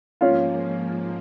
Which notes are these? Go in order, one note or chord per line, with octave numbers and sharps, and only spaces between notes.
G#2 F3 A#3 C#4 F4